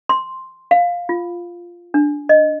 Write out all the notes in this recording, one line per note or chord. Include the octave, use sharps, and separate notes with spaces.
C6
F5
F4
D4
D#5